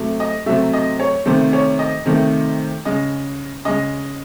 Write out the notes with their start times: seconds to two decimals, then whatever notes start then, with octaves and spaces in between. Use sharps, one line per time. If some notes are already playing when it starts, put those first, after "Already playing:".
Already playing: C3 F#3 A3
0.20 D#5
0.46 C3 F#3 A3 E5
0.73 D#5
1.00 C#5
1.26 C3 D#3 A3 C5
1.53 C#5
1.79 D#5
2.06 C3 D#3 A3
2.85 C#3 G#3 D#5
3.65 C#3 G#3 D#5